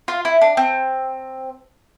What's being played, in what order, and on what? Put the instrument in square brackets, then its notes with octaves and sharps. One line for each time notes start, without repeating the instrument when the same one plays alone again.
[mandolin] F4
E4
D4
C4